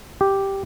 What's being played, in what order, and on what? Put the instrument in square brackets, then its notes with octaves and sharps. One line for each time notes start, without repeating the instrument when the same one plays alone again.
[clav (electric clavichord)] G4